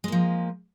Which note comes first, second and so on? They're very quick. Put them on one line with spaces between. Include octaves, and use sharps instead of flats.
G#3 A#3 F3